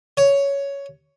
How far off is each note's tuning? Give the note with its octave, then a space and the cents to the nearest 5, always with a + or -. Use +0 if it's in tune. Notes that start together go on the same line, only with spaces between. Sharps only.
C#5 +10